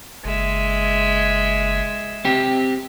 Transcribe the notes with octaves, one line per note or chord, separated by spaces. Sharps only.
F#1 G#3 E5
C4 G4